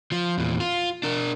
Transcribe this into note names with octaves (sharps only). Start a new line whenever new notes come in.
F3 F4
E2 A#2
F4
D4 A#4